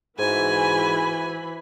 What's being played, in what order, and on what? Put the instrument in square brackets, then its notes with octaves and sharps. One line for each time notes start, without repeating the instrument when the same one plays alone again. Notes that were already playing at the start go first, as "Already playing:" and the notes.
[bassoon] G#2 [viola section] E3 B5 [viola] F#4 G#5